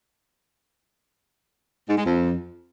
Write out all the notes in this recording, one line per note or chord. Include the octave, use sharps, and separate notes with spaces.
G#2
G#3
F2